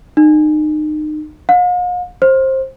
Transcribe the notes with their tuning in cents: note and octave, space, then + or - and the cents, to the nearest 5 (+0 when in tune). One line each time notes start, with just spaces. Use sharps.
D#4 -30
F5 +45
C5 +20